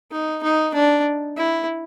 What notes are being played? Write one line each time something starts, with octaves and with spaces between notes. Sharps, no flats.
D#4
D#4
D4
E4